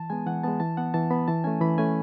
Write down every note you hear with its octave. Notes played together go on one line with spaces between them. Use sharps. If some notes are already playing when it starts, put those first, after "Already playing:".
Already playing: E3 A5
G#3 B3 G#5
E3 F#5
G#3 B3 A5
E3 A5
B3 F#5
E3 A5
B3 B5
E3 A5
A3 C#4 G#5
E3 B5
A3 C#4 G#5